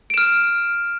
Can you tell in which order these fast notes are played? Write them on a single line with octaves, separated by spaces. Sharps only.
D7 E7 F6